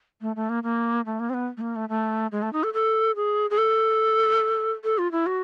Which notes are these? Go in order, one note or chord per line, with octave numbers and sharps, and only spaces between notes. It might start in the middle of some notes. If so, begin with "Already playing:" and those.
A3
A3
A#3
A#3
A3
A#3
C4
B3
A3
A#3
A3
A3
G#3
A3
D#4
A4
A4
G#4
G#4
A4
A4
F4
E4
F#4